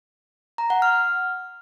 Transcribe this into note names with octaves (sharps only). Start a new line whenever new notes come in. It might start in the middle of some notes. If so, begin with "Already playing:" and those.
A#5
F#5
F6